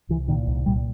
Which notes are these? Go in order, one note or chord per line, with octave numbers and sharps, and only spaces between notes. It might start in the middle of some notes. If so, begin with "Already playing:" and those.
C2 E3
A#2 D#3
C2
A#2 G3